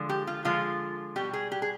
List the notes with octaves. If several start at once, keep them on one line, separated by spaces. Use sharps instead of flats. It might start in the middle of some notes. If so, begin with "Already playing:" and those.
Already playing: D3 F3 G#3
G4
F4
D3 F3 G#3 F4
B2 G3 G4
G#4
G4
G#4